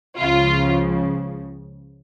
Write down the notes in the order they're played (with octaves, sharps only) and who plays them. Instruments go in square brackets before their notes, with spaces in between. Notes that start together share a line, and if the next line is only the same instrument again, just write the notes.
[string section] C#2 C#3 F3 F4